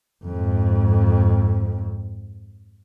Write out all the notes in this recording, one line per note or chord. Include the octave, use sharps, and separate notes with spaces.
F2 G#2